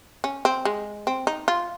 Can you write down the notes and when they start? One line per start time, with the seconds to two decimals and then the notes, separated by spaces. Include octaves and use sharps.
0.24 C#4
0.45 C4
0.65 G#3
1.07 C4
1.27 D#4
1.48 F4